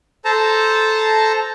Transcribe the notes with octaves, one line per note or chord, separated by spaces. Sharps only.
A4 C5 A5 A#5